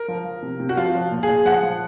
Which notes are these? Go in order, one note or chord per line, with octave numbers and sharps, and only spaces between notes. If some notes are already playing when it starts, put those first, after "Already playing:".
Already playing: A#4
F3
F3
C3
C3
F#4
F3 F4
F3
A#2
G#4
A#2
F3 F#5
F3